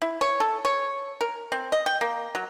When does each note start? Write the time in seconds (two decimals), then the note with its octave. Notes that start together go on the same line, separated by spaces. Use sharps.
0.02 E4
0.21 C#5
0.40 A4
0.65 C#5
1.21 A#4
1.52 C4
1.72 D#5
1.86 G5
2.01 A#3
2.35 F#3